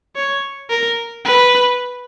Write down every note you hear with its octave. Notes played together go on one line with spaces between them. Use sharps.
C#5
A#4
B4